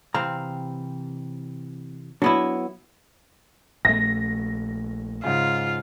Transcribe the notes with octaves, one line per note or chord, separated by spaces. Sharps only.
C3 E3 C4 F5 A#5
F#3 B3 D4 E4
A#1 A3 A#6
G#2 C#3 F4